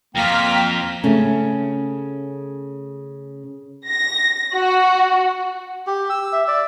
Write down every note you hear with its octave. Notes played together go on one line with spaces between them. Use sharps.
F2 A#3 F4 G5 A#5 F6 B6
C#3 A3 C#4
A#6
F#4
G4
E6
E5
D5